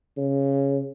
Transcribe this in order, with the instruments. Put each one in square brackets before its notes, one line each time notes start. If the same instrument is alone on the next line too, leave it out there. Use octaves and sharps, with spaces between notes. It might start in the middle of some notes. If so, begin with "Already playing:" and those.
[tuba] C#3